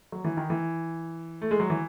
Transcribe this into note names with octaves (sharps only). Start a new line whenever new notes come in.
F#3
E3
D#3
E3
A3
G#3
F#3
E3